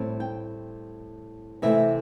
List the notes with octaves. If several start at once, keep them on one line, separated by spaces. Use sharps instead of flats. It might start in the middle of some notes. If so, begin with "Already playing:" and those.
Already playing: A2 G3 C4
G5
C3 E3 A3 C4 E5